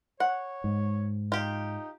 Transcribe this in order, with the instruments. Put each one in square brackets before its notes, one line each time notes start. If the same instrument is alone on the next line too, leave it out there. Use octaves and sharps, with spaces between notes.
[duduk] C#5 [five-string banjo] F#5
[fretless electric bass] G#2
[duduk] D#4 [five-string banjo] F4 G4